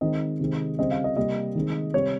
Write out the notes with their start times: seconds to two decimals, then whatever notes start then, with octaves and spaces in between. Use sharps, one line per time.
0.01 D#3 G#3 C4 D#5
0.40 C3 D#3 G#3 C4
0.79 C#3 G3 C4 D#5
0.91 F5
1.04 D#5
1.16 C3 G3 A#3 D#5
1.55 D#3 G#3 C4
1.94 C3 G3 C4 C#5